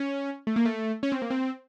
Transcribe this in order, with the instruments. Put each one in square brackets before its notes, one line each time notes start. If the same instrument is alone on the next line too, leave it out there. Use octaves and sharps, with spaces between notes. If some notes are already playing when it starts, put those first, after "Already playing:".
Already playing: [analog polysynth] C#4
A3
A#3
A3
C#4
C4
A#3
C4